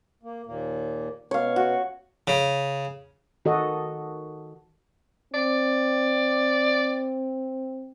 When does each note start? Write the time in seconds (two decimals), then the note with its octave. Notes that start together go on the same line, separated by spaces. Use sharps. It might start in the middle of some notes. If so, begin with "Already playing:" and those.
0.23 A#3
0.46 D#2 A#2 A#3
1.31 B2 B3 C#5 F5
1.56 F#4
2.27 C#3
3.45 D#3 F#4 A4 D#5
5.34 C4 D5